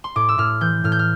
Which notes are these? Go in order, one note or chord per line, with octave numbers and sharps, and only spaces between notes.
C6
A2 D6
E6
A2 F6
E3 G6
A2 F6
G6
F6